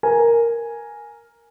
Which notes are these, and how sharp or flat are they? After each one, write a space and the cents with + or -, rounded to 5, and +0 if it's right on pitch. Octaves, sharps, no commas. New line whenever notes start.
A#4 +0 G#5 +0